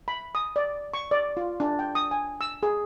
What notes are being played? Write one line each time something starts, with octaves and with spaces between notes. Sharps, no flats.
B5
D#6
D5
C#6
D5
F4
D4
G5
D#6
G#5
E6
G#4